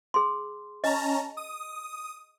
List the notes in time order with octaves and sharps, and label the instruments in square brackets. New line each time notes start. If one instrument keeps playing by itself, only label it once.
[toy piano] G#4 C6
[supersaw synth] C#4 A5 A#5 [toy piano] D#5
[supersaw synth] D#6